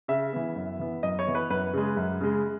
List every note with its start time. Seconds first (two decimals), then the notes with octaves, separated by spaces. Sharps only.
0.08 C#3 E5
0.33 E3 B3
0.56 F#2
0.79 E3 B3
1.03 F#2 D#5
1.19 C#5
1.27 E3 B3
1.35 B4
1.50 F#2 B4
1.73 C#3 G#3
1.97 F#2
2.21 C#3 G#3